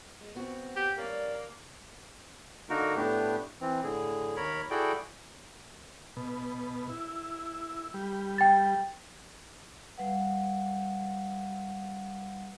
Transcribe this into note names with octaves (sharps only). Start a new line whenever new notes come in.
G#3
B3 C4 F#4
G4
G2 A#3 C#4 D5
D3 A#3 D#4 F#4 A#4
A2 A3 B3 D4 G4
E3 C4
A2 D3 G#4
D#2 A#4 C#5 B5
E4 F#4 G#4 A4 D5 G5
B2
E4
G3
G5 A6
G3 B4 F5 F#5